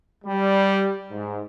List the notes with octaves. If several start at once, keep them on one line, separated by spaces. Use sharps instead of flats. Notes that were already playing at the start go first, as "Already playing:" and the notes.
G3
G#2